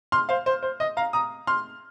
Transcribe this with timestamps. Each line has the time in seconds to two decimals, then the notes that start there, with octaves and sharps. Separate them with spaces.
0.12 C6 F6
0.29 C5 F5
0.46 C5
0.63 C5
0.80 D#5
0.97 F5 A#5
1.13 A#5 D#6
1.47 C6 F6